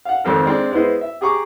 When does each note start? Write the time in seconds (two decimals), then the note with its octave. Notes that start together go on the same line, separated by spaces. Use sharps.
0.05 F5 F#5
0.24 G#1 F2 C4 A4 A#4
0.46 G#3 C4 D4
0.72 G#3 B3 E4 C5 D#5
1.01 E5
1.21 G4 G#4 A#5 C#6 D6